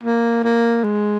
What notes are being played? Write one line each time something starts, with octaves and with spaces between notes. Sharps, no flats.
A#3
A#3
G#3